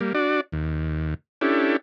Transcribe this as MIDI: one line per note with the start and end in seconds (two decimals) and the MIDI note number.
0.01 0.13 55
0.01 0.13 58
0.15 0.41 62
0.15 0.41 66
0.15 0.41 74
0.52 1.14 39
1.41 1.77 61
1.41 1.77 62
1.41 1.77 64
1.41 1.77 67
1.41 1.77 69